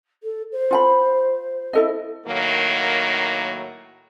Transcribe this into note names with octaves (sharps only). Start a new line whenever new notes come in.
A4
C5
F4 G5 B5
E4 A4 D#5
A2 D#3 F#3 A#3